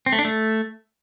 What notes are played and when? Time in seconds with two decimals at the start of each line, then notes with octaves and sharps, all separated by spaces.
0.06 C4
0.13 A3
0.19 D4
0.25 A3